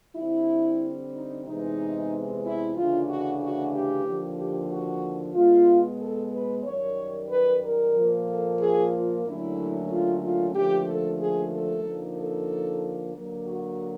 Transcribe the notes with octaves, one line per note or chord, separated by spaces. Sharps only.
D3 G3 C4 E4
D#4
E2 C3 E3 G#3 D#4
E4
D2 C#3 E3 A3 D4 F4
F#4
F#4
G4
D#2 D3 F3
G4
F#4
B2 G#3 B3 F4
A4
B4
F#2 D#3 G3 C#5
B4
A#4
A#2 F3 A#3
A4
G#4
F4
D#2 D3 F#3 A3 C#4 E4
F4
F4
D#2 D3 F3 A3 G4
A4
G#4
A4
D3 F3 A#3 D#4
A4
D3 F#3 A#3
F#4